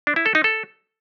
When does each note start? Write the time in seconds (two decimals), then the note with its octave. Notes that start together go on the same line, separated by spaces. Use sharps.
0.07 D4
0.16 E4
0.26 A4
0.35 D#4
0.44 A4